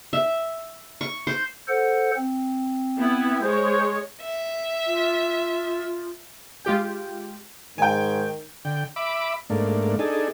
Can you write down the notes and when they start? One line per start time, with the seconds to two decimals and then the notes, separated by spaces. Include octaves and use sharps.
0.13 E5
1.01 C#6
1.27 C5
1.68 A4 C5 F#5
2.16 C4
2.98 B3 E4
3.42 G#3 C5 C#5
4.21 E5
4.87 F4
6.65 G#3 F4 G4 G5
7.78 G#2 D#3 G5 G#5
8.65 D3 G5
8.96 E5 B5 D6
9.50 G#2 A3 A#3 D4
9.99 D4 D#4 G#4 A4